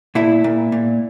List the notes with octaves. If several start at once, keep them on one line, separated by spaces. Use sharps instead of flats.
A#2 E4
A#2
A#2